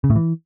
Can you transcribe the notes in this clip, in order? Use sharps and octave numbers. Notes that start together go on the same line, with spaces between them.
C#3
A2
E3